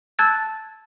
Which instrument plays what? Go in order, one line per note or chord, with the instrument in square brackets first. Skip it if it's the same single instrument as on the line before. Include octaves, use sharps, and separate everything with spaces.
[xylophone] A5 E6 F#6 G#6 A6